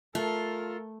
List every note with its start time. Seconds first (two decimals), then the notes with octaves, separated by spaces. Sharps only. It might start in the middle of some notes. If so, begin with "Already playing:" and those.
0.15 A3 F4 A4 A#4